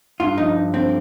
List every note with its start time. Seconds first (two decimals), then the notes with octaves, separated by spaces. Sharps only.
0.20 G2 F4
0.38 F3 D#4
0.56 G2
0.73 D3 C4